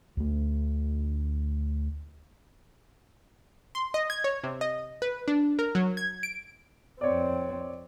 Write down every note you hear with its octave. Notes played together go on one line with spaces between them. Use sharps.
D2 A3
C6
D#5
G#6
C#5
C3
D#5
B4
D4
A#4
F#3
G#6
D7
F2 C4 C#5 D5